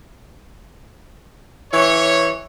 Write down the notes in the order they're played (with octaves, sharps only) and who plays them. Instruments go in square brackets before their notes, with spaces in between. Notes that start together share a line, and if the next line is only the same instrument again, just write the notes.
[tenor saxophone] E3 [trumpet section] C#5